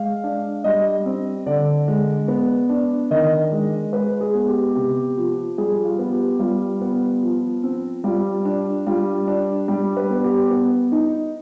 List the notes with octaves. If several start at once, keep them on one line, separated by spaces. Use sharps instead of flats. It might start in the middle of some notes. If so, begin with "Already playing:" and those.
Already playing: G#3 F5
D4
G3 D#5
C4
D3 D5
G#3
B3
D4
D#3 D#5
G#3
G#3 B4
G#4
B3
G4
C3 G4
F3
G3 G#4
F4
B3
G4
G3 F4
B3
F3
C4
G3 F4
D4
G3 F4
D4
G3
B4
B3
G4
B3
D#4